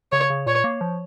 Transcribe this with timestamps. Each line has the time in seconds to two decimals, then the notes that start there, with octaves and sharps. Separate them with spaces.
0.12 C#3 C#5
0.30 C#3
0.46 A#2 C#5
0.64 A#3
0.81 F3